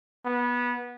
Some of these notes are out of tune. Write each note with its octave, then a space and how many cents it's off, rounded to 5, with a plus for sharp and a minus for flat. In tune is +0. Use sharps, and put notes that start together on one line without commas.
B3 -20